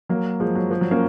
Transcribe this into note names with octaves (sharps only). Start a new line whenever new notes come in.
F#3 A#3
F3 G#3
F#3
F3
F#3
A#3 C#4